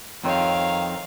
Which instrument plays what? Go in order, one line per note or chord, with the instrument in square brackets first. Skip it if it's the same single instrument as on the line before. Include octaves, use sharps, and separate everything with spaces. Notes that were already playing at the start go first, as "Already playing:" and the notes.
[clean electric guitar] F2 D#3 C4 [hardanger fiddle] C#5 F5